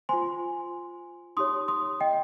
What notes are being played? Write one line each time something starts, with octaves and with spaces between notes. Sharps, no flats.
F4 C5 G#5 C6
D#4 G4 C#5 C6 D#6
C6 D#6
D#5 G5